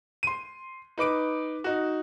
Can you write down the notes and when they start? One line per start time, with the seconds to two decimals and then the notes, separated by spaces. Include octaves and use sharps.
0.23 C6 D#7
0.98 D#4 B4 D6 D7
1.64 D#4 F#4